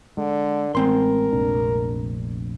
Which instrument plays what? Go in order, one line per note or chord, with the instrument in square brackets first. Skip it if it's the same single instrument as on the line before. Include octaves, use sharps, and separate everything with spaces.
[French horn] D3 [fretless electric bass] G#3
[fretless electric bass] A1 [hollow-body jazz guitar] G#3 C4 C6 [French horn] A#4
[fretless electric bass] F1 A#1 D4